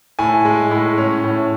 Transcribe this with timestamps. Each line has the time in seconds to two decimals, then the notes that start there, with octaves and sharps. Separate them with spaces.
0.19 A2 G#5
0.45 G#3
0.71 A2
0.98 C#4
1.24 A2